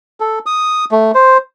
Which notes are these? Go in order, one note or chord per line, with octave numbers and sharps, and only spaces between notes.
A4
D#6
A3
C5